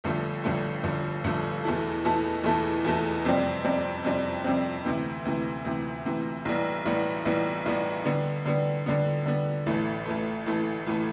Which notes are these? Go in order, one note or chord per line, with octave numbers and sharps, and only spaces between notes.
G1 G2 D3 F3 A3
G1 G2 D3 F3 A3
G1 G2 D3 F3 A3
G1 G2 D3 F3 A3
E2 B2 A3 E4 A4
E2 B2 A3 E4 A4
E2 B2 A3 E4 A4
E2 B2 A3 E4 A4
F2 C3 G3 C4
F2 C3 G3 C4
F2 C3 G3 C4
F2 C3 G3 C4
D2 C3 E3
D2 C3 E3
D2 C3 E3
D2 C3 E3
B1 A2 E3 G3 B3
B1 A2 E3 G3 B3
B1 A2 E3 G3 B3
B1 A2 E3 G3 B3
D3 G3 B3
D3 G3 B3
D3 G3 B3
D3 G3 B3
A1 A2 E3 A3
A1 A2 E3 A3
A1 A2 E3 A3
A1 A2 E3 A3